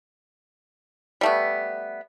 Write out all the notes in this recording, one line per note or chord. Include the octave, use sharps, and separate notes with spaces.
G3 A3 B3